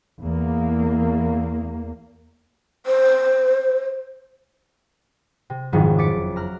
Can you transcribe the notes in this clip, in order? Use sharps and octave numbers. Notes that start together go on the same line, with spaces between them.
E2 A#3
C5
C3
F#1 F2 G#2 D#3
D6 A6 B6 C#7 D7
A#5 F6 F#6